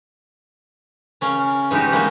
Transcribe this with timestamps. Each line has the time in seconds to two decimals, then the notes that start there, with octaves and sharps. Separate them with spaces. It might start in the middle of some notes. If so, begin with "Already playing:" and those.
1.21 C#3 C#4 A#4
1.71 E3 G#3 D#4 F#4 G4
1.91 C3 G3 G#3 A#3 B3 F#4